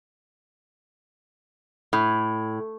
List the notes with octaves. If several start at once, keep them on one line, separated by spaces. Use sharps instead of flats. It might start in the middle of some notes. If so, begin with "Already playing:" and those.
A2